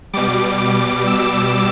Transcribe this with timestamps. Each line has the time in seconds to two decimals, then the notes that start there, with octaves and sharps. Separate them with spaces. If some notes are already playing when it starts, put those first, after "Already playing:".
0.13 B2 G3 D6
0.60 D6
1.07 E6